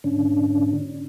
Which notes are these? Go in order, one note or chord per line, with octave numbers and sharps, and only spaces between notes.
G#2 D3 C#4 D4